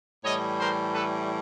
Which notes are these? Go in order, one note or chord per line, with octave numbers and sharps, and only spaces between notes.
A2 E3 G3 C#5 D#5
A#4 C5
A4 B4